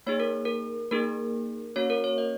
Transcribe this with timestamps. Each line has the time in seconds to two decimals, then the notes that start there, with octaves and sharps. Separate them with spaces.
0.07 A#3 D#4 G#4 C#5
0.20 A#4
0.45 A#4
0.91 A#3 D#4 G#4 A#4
1.76 A#3 C#4 F#4 C#5
1.90 A#4
2.04 C#5
2.18 D#5